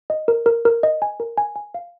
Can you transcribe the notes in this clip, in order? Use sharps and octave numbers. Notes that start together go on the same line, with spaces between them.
D#5
A#4
A#4
A#4
D#5
G#5
A#4
G#5
G#5
F5